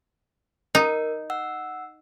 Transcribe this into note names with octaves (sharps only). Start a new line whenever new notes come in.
D#4 A#4
F#5 E6